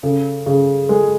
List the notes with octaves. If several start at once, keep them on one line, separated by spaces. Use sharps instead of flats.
C#3 A4
C#3 G#4
G#3 A4